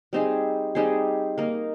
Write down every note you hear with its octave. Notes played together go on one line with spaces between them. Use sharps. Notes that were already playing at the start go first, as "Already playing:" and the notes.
G3 C4 D#4 G#4
G3 C4 D#4 G#4
A#3 D#4 A#4